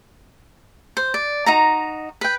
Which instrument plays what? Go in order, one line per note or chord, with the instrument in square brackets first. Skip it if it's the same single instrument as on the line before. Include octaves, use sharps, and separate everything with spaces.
[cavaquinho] C5
D5
D#4 F#4 A#5
B4 G5